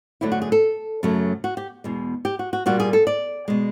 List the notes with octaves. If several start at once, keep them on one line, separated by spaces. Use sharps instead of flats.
F#2 D3 F#3 A3 E4
F#4
G#4
A4
F#2 C#3 F#3 A3
F#4
G4
E2 B2 G#3
G4
F#4
F#4
A#2 G3 A#3 F#4
G#4
A4
D5
B2 G#3